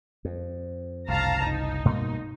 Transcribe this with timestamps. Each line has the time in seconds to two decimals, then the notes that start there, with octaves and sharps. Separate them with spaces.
0.25 F2
1.09 F#1 C2 F5 A5 A#5
1.45 D#4
1.85 G2 B2 A#3